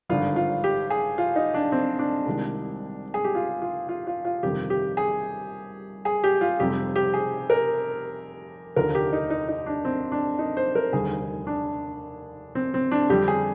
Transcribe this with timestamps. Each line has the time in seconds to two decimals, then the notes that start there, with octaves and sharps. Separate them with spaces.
0.09 G#1 G2 D3 F3 F4
0.36 F4
0.64 G4
0.90 G#4
1.18 F4
1.36 D#4
1.54 D4
1.72 C4
1.99 D4
2.26 C2 C3 D#3 G#3
3.14 G#4
3.24 G4
3.35 F4
3.62 F4
3.89 F4
4.07 F4
4.25 F4
4.43 G1 F2 C3 D#3 G4
4.70 G4
4.97 G#4
6.05 G#4
6.24 G4
6.41 F4
6.59 F1 F2 C3 G3 G4
6.96 G4
7.14 G#4
7.50 A#4
8.76 F1 D#2 D3 F3 A#4
8.95 G4
9.13 D#4
9.30 D#4
9.49 D#4
9.66 D4
9.85 C4
10.12 D4
10.39 D#4
10.57 C5
10.75 A#4
10.93 F1 D#2 D3 G3 G#4
11.47 D4
12.55 C4
12.74 C4
12.92 D4
13.09 F2 D3 G3 G4
13.28 G#4